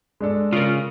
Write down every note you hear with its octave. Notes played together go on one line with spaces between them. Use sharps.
G#3 D4 A4
C#3 F4 A#4